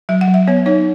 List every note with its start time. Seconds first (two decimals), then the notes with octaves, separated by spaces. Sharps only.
0.09 F#3 E5
0.21 F#5
0.28 F#3
0.34 E5
0.47 B3 C#5
0.66 D#4 C#5